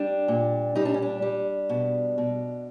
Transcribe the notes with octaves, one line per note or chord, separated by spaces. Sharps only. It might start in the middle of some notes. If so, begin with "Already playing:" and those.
Already playing: G3 D4
A#2
G3 D#4
D4
C#4
D4
G3
B2
B2